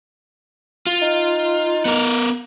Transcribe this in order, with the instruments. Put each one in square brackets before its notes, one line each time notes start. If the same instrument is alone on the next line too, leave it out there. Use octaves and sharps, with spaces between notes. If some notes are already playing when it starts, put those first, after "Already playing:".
[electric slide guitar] F4
[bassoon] D#4
[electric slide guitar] B3 A#4